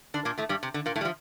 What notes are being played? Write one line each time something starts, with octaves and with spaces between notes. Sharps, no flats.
D3 D4
A#2 A#3
A2 A3
G2 G3
C3
D3
A#2 A#3
A2 A3
G3
F3